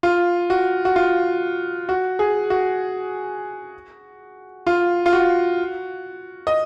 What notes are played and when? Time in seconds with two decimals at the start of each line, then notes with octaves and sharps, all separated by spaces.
0.03 F4
0.50 F#4
0.85 F#4
0.96 F4
1.89 F#4
2.19 G#4
2.50 F#4
4.67 F4
5.06 F4
5.13 F#4
6.47 D#5